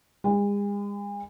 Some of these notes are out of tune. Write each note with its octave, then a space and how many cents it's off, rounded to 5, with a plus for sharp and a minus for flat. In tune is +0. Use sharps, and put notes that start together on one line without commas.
G#3 -40